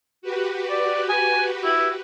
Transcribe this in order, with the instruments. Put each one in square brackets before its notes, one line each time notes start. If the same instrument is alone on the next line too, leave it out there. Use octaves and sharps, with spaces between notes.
[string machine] F#4 G4 B4
[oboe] D5
G#5
E4